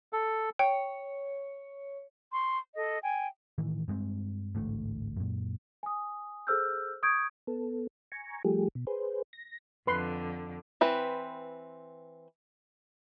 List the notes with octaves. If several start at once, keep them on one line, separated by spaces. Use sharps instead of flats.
A4
C#5 G5
C6 C#6
A4 D#5
G5 G#5
A2 D#3 E3
G2 G#3 A3 C4
A1 D2 G#2 A3
F#2 A#2
G#5 D#6
G#4 A4 C5 E6 F6 G6
C#6 D#6 G6 G#6 D7
B3 A4
G#5 A#5 C#6
F3 G3 A3 G4 G#4
B2
G#4 B4 C5
A#6
F2 D3 B4 C6
E3 C4 B4